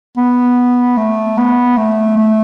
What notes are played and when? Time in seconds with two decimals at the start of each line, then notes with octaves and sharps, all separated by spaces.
0.17 B3
0.97 A3
1.37 B3
1.77 A3
2.17 A3